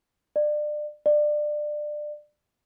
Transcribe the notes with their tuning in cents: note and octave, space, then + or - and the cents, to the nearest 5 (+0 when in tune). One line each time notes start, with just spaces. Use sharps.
D5 +30
D5 +25